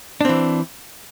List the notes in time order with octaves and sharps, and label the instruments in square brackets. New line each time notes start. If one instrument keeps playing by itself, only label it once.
[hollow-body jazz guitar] D4
C4
E3